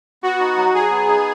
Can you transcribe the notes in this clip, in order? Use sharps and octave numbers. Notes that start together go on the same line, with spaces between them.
B3 F#4
D#4
F#3
F#3 G#4
B3
D#4